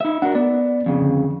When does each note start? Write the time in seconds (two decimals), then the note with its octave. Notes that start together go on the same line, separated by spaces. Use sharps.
0.01 D#4 E5
0.22 D4 F#4 A#4 F#5
0.35 B3 D5
0.86 F2 C#3
1.02 D3